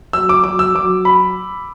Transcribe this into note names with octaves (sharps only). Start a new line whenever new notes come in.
F#3 E6
D6
F#3 D6
E6
F#3 D6
B5